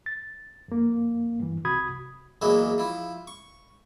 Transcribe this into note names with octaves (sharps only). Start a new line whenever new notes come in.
A6
F2 A#3
G2 E3
C2 C3 F#4 B5 D#6 G#6
E2 F#3 G#3 A#3 E4 E5
F3 E4
C#6